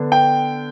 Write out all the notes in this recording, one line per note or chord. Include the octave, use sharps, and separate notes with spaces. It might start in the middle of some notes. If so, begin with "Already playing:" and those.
Already playing: D3 B3 D4
G5